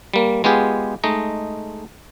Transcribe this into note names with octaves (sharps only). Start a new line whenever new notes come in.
G3 A#3
G#3 B3 F4 G4 G#4
G#3 A3 D#4 D#5